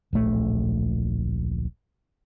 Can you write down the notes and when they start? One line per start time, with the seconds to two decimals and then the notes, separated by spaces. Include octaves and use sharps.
0.13 D1 A#1 A3